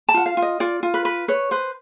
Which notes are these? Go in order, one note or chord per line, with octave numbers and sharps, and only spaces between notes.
A5
F4 F#5
F5
F4
D#5
F4 D5
F4
B4
B4
B4 C#5
B4 C5